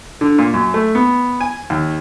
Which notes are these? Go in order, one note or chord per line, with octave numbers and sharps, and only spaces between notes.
D3
A#2
F#2
A3
B3
G#5
D#2